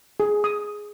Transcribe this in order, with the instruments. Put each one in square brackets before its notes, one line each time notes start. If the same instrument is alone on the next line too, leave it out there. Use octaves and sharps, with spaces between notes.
[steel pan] G#4
D#6